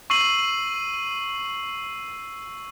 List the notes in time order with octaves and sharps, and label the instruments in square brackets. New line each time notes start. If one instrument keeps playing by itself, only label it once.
[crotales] C#6 E6 C7 D#7 F#7